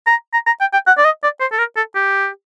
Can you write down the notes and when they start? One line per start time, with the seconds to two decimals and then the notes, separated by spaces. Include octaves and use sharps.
0.07 A#5
0.33 A#5
0.46 A#5
0.60 G5
0.73 G5
0.87 F#5
0.98 D5
1.05 D#5
1.23 D5
1.40 C5
1.52 A4
1.58 A#4
1.76 A4
1.95 G4